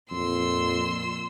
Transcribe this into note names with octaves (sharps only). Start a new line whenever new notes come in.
F2 A#2 C6 E6